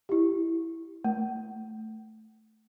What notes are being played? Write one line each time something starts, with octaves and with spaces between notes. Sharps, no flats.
E4 G4
A3